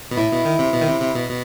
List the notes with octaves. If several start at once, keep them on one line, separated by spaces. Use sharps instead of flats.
B2
A2 E4
B2
D#3
C3
B2
D#3
C3
C3
B2
B2